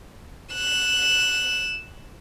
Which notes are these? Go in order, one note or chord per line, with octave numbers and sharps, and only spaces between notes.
F#6 E7